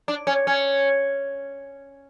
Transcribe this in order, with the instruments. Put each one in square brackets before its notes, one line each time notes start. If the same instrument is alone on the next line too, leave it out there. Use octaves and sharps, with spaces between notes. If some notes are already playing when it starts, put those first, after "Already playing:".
[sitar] D4
C#4
C#4